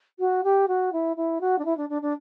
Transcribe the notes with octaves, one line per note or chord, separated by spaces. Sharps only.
F#4
G4
F#4
E4
E4
F#4
D4
E4
D4
D4
D4